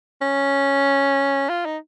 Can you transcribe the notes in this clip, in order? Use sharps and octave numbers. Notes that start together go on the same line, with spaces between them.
C#4
F4
D#4